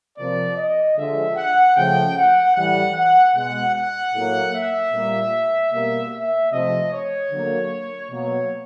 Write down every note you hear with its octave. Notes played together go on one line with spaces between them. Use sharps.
C3 F3 A#3 D5
D#5
D3 F3 G#3 E5
F#5
C#3 F3 A3 G5
F#5
A2 E3 G3 F#5
F#5
B2 G#3 F#5
F#5
A2 F#3 A#3
E5
A#2 G3 A#3
B2 G3 A#3 E5
E5
C3 F3 A3 D#5
C#5
D3 F#3 A#3
B2 F#3 A#3 C#5